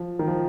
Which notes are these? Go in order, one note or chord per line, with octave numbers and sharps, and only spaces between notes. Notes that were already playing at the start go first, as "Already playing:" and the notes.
Already playing: F3
D#3
F3